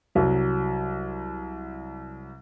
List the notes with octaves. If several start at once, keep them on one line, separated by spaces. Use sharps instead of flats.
C2 F#3